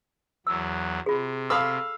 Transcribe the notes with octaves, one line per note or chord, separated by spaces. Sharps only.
E2 F#3 E6
C3 F4 G#4
A4 F5 A5 B5 C#6 E6